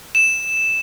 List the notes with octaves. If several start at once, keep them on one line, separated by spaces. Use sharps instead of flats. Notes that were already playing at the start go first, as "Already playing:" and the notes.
E7